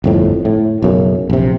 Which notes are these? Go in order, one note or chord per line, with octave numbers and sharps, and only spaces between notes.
G1 F2 A2
A2
B1 F#2 C#3
A#1 C3